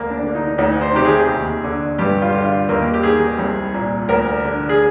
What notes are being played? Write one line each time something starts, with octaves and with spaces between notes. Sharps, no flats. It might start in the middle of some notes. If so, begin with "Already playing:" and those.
Already playing: D2 A#3
D4
D3
D#4
D2 D#4
C5
C3 D#3 G4
G#4
D#2
D3
G2 G4
F4
D3
F4
D#2 A#3
G4
D#3 G#4
C2
A#2
D2 A#4
D3
G#4